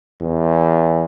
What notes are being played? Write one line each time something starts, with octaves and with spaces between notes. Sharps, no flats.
E2